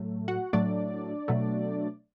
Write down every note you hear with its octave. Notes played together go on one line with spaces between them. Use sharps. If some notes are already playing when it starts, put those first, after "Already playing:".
Already playing: A2 F#3 A3
F#4 F#5
A2 F#3 A3 D4 D5
B2 F#3 A3